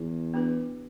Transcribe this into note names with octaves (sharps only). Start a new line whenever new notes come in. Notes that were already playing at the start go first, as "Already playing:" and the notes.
Already playing: E2
B3 D4 F#4 B4